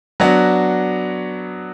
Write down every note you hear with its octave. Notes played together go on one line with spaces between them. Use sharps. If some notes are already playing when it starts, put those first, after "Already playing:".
F#3 B3 D4 F#4